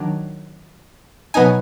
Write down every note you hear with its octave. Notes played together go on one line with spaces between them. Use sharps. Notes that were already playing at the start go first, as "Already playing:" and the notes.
Already playing: D#3 F#3 D4
B2 F#3 B3 D#4 G#5